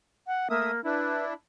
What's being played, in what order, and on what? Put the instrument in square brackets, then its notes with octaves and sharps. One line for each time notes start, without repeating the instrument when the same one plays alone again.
[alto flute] F#5
[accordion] A3 E5 D#6 [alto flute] A#3
[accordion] D4 E4 [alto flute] B4